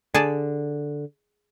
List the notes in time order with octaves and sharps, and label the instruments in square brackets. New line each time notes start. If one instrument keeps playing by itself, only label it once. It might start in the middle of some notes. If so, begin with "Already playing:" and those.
[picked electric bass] D3 [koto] G#4 D5 A5